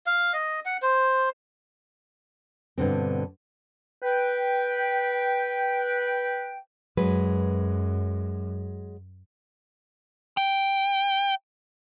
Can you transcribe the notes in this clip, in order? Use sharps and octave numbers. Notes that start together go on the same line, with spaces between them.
F5
D#5
F#5
C5
G2 B2 D3 C4
B4 G5
F#2 F#3 G#3 B4
G5